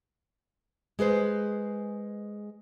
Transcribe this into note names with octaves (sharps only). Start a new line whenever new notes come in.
G#3 G#4 B4 C5